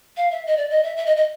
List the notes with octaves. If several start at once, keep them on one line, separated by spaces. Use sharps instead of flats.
F5
E5
D#5
D5
D#5
E5
E5
D#5
D#5